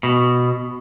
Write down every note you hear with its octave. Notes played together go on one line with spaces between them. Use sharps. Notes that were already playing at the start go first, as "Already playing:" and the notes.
B2